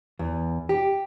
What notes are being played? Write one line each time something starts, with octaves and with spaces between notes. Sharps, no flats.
E2
G4